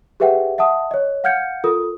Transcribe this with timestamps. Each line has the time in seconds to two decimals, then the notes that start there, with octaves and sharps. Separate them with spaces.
0.20 G4 G#4 B4 E5 F#5 G5
0.58 E5 F#5 A5 D#6
0.91 C#5 D#5
1.24 F5 F#5 F6 G6 G#6 C#7
1.64 F4 A4 A#4 D#6